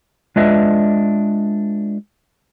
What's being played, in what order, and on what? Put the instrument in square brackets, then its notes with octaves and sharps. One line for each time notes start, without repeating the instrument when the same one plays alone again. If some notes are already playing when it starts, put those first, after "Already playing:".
[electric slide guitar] G#3 D4 F4 B4 D#5 E5